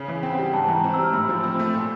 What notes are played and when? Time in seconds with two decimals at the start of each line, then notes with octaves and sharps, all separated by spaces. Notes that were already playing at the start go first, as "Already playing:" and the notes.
Already playing: C#3 C#4
0.08 E3
0.23 C4 G5
0.33 F#5
0.39 G3 G5
0.53 G#2 A5
0.64 A5
0.68 E3 A#5
0.84 C4 A#5
0.94 E6
0.98 G3 F6
1.13 A2 E6
1.29 F3
1.43 C4 E6
1.59 A3
1.74 A#2